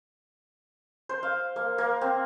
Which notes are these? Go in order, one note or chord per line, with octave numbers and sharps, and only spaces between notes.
C5
F5
A#3
A#3
C4